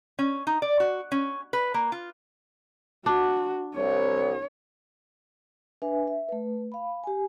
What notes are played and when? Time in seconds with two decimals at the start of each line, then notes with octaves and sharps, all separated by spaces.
0.19 C#4
0.47 D#4
0.62 D5
0.80 F#4
1.12 C#4
1.53 B4
1.74 A#3
1.92 F4
3.06 D4 F#4
3.76 C2 C#5
5.82 D4 B4 E5 G#5
6.07 E5
6.29 A3 B4
6.72 F5 B5
7.04 G4 G#5